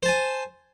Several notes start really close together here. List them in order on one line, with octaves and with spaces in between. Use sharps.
C5 A5 G#5